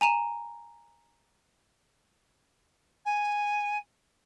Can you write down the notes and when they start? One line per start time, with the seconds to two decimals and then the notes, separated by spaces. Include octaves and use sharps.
0.01 G#5 A#5 D#7 E7
3.05 G#5